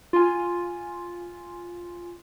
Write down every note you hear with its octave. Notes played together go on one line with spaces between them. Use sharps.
F4 G#5